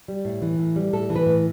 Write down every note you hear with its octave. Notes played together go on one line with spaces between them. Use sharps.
G3
A2
E3
A2
G3
A2 A4
E3
B4
A2